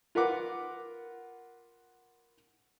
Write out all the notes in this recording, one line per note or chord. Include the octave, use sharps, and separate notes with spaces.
F4 A#4 B4 F#5 D6